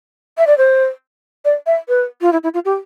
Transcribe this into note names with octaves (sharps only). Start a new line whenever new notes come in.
E5
D5
C5
D5
E5
B4
F4
E4
E4
F4
G4